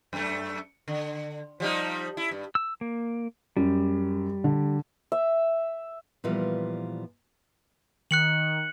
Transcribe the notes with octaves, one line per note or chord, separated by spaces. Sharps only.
F#2 A3
D3
F3 G3 D#4
E4
G2
E6
A#3
F#2 G3
D3
E5
A#2 E3 F3 G3 B3
D#3 F#6 C#7 F#7